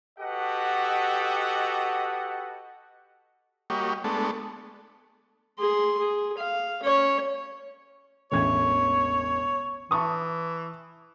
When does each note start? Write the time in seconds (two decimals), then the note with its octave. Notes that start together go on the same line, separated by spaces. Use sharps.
0.19 F#4 G4 A4 B4 D#5 F#5
3.70 G3 A#3 F#4 G4 C#5 D#5
4.04 G#3 A3 B3 D4 A4
5.59 G#4 C6
5.99 G#4
6.38 F5
6.83 C#4 C#5
8.32 E1 A1 C#5 G#6
9.91 E3 A5 C#6 D#6